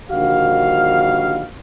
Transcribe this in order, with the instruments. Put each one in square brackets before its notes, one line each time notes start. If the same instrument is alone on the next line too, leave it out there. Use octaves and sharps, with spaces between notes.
[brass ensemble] A#1 D3 D#3 G3 F#4 F5